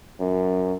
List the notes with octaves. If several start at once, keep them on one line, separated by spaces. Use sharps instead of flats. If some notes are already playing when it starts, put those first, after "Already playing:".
F#2